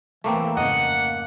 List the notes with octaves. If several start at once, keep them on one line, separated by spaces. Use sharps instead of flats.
E3 A3 A#3 C4
F2 G#2 C#3 A#3 D#5 F#5